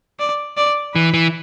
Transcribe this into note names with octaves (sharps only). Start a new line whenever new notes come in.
D5
D5
E3 B4
E3